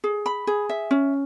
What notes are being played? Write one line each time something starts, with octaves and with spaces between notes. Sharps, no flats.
G#4
B5
G#4
E5
C#4